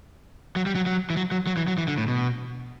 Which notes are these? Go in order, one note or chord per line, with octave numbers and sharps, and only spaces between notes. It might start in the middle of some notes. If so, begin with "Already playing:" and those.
F#3
G3
F#3
F#3
E3
F#3
F#3
F#3
E3
F#3
E3
D3
A2
B2